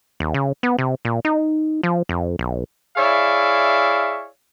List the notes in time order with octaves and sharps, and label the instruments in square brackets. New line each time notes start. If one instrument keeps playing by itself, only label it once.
[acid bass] D#2
C#3
B3
C3
A#2
D#4
F3
F2
B1
[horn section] E4 G#4 C#5 D5 E5 F5